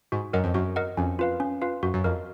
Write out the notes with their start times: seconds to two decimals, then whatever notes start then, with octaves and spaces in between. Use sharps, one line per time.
0.12 G#2 F#4
0.33 F#2 A#4 D#5 F#5
0.44 F2
0.54 F#2 F#4
0.76 A#4 D#5 F#5
0.97 F2 C#4
1.19 F4 B4 F5
1.40 C#4
1.62 F4 B4 F5
1.83 F#2 F#4
1.94 F#2
2.04 F2 A#4 D#5